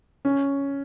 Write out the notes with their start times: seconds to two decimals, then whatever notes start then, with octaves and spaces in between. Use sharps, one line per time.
0.25 C#4